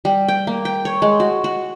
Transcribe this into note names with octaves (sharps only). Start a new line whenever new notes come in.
G3
G5
A#3
G5
C#5
G#3
F#4
F#4